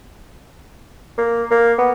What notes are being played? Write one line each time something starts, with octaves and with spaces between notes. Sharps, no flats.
A#3
A#3
B3